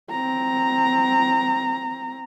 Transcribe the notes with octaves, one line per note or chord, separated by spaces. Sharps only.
C4 A#5